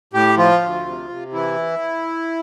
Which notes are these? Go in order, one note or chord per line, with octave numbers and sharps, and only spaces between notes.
A2 G4
F3 F4
D2
C3
C3
E3 E4